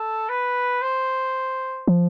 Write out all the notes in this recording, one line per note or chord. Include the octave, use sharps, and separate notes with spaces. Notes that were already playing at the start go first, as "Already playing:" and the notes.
Already playing: A4
B4
C5
F3